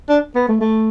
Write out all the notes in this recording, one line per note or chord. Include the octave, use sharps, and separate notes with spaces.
D4
B3
A3
A3